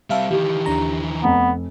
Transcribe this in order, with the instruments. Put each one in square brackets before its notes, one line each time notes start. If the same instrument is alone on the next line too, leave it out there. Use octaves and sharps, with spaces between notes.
[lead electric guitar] G3 C4 [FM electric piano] E5 F5 A5
[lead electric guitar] D#3 E3 [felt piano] G4
[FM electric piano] D#2 D4 A#5
[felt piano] F1 [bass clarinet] B3